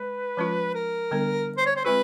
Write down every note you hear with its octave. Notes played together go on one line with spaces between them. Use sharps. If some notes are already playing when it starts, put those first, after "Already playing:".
Already playing: G#3 B4
F3 G#3 C#4 F4
A#4
D3 G3 B3 D4
C5
C#5
C5
G#3 C4 F4 G#4 B4